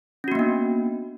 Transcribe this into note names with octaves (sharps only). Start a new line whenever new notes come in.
A#3 B3 C#4 D4 F#4